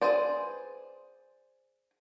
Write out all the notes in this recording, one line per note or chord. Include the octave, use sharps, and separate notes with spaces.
G#4 B4 C5 D5